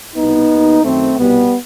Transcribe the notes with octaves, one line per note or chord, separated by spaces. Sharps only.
C2 B2 B3 D#4
D#2 D#3
F#2 D#3 A3 C4
C2 B2 G3 B3